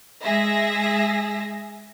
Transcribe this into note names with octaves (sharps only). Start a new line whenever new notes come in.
G#3 G#4 E5 A#6